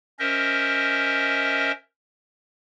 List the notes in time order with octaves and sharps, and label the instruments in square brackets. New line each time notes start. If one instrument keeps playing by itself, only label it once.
[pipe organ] C#4 A#4 C5 D#5 E5